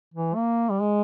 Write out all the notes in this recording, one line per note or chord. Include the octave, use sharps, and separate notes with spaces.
E3
A#3
G3
G#3